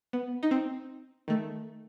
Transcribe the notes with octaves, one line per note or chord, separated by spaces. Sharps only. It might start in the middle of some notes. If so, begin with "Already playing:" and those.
B3
D#4
C4
D#3 A3